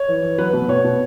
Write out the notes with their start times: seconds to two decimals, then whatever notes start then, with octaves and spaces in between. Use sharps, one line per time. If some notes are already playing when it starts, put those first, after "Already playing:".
Already playing: C#5
0.08 E3
0.23 E3
0.38 F#3 B4
0.53 B2
0.69 B2 C#5
0.85 B2